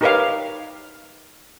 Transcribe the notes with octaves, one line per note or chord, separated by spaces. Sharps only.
D#4 G4 A#4 B4 C#5 F5